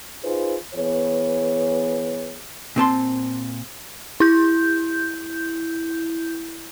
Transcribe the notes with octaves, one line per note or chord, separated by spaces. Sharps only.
D#4 F4 G#4 B4 C5
E3 B3 G#4 C#5
A#2 C4 A5 C6
E4 G6